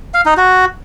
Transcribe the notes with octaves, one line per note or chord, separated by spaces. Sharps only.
F5
D#4
F#4